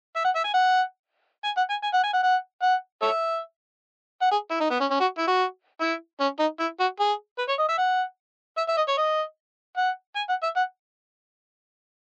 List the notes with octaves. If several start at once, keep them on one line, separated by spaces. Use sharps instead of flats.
E5
F#5
E5
G#5
F#5
G#5
F#5
G#5
G#5
F#5
G#5
F#5
F#5
F#5
A4 C#5 E5
F#5
G#4
E4
D#4
B3
C#4
C#4
F#4
E4
F#4
E4
C#4
D#4
E4
F#4
G#4
B4
C#5
D#5
E5
F#5
E5
E5
D#5
C#5
D#5
F#5
G#5
F#5
E5
F#5